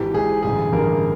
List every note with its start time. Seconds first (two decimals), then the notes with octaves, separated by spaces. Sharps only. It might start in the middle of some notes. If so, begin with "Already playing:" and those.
Already playing: G#1 G#2 E3 G4
0.14 G#1 G#2 E3 G#4
0.43 A1 G2 D3 G#4
0.72 A1 G2 D3 A#4